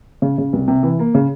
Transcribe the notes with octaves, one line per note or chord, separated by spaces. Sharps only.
C#3
C#3
C2
C3
E3
A#3
C#3